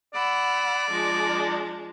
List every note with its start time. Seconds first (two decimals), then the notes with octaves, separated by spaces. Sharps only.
0.14 D5 F#5 B5 E6
0.90 F3 G#3 D4